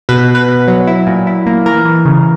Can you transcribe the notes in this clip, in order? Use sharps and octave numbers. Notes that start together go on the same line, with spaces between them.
B2 B4
B2
B4
B2
F#3
E4
A#2
E4
A#3
E3 A#4
E3
C#3